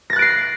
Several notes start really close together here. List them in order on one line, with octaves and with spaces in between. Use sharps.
A#6 A6 F#6 D7 C7